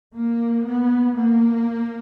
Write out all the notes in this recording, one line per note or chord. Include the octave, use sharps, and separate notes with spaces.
A#3
B3
A#3